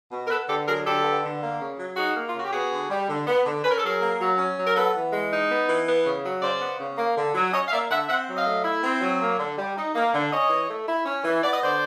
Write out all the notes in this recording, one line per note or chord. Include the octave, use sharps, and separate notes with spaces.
B2
A#4
B3 A4 B4
D3 G4 A4
F#3 G#4 A#4
D3 G4 A4
B3
D3
A#3
C#3
F#3
D#4 F#4 G#4
A#3
F4
C#3 F#4
G4
B3 F#4 G#4
D3
G3
D3
B3
D3
C#4 B4
A#4
A4
F#3 G#4 A#4
A#3
F#3
C#4
F#3
A#4
B3 A4 B4
E3
G#3
D#4
B3
E3
B3
C#3
F#3
C#3 C5 D5
B3
C#3
A#3
D3
F#3
C#4 C#5 D#5
F5
A#3 D5 E5
D3 E5 F#5
C4 E5 F#5
F#3
D#5 F5
A3
E4
C4
F#3
A#3
D3
G3
D#4
A#3
D3
C#4 C#5 D#5
E3
A3
E4
C#4
E3
B3 D5
D#5
D3 C5 D5